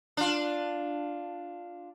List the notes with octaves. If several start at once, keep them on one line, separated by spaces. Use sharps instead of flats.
D4 F4